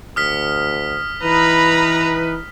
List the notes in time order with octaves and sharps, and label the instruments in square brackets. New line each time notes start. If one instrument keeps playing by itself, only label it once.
[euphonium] D2 [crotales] D#6 F6 B6
[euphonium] E3 [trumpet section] D#4 B4 [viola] A#5 B5